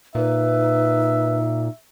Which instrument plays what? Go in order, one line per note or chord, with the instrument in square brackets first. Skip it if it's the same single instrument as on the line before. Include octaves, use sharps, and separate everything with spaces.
[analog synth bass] A#2 [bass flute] D#4 [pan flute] B4 [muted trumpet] E5